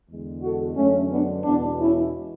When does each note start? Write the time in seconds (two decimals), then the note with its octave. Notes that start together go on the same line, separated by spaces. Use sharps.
0.09 E2 D3 G#3
0.43 F#4 A4
0.76 F#2 D3 G#3 A3 C#4
1.10 B3 D4
1.44 E2 B2 G#3 B3 D4
1.78 C#4 E4